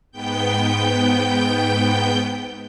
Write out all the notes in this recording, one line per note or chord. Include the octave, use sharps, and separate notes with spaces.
G#2 B3 G5 G6